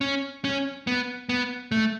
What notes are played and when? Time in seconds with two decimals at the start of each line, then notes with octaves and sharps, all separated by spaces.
0.01 C#4
0.44 C#4
0.87 B3
1.29 B3
1.72 A3